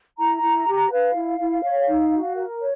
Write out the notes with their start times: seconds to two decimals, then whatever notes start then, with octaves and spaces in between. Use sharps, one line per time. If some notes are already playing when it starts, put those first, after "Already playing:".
0.18 E4 A#5
0.42 E4
0.67 G4
0.91 B4 F5
1.15 E4
1.40 E4
1.63 C#5
1.88 D#4
2.12 F#4
2.36 A#4
2.60 C#5